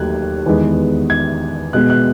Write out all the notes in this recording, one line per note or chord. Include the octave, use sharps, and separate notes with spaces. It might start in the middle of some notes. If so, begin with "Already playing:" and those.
Already playing: D#2 F#3 A3 F#6 G#6
E2 D#3 G#3 B3
G#6
B2 G#3 B3 F#6
F#6